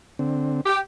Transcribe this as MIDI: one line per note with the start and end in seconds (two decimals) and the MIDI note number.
0.19 0.61 50
0.19 0.61 60
0.66 0.78 67